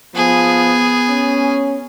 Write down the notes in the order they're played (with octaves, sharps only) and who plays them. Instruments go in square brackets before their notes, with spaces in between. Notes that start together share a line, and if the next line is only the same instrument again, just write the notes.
[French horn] F3 [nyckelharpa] B3 [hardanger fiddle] G#4
[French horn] C#4